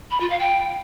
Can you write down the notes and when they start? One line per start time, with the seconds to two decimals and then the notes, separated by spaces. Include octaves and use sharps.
0.11 B5
0.20 F4
0.30 F5
0.40 G5